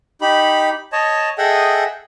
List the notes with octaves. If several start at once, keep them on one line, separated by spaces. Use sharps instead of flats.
D#4 G4 B5
C#5 D#5 A5
G#4 A4 D#5 E5 F#5 G5